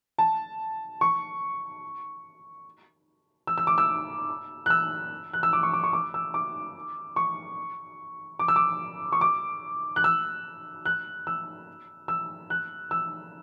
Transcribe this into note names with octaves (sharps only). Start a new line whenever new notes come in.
A5
C#6
E6
E6
D6
E6
F#6
E6
F#6
E6
D6
C#6
D6
C#6
D6
E6
D6
C#6
D6
E6
D6
C#6
D6
F#6
E6
F#6
E6
E6
F#6
E6